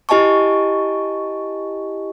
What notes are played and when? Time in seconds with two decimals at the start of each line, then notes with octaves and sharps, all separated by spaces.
0.09 E4 G4 D#5 G#5 A5 C#6